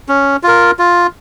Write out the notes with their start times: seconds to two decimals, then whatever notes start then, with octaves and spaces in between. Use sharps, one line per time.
0.09 C#4
0.43 F4 A#4
0.79 F4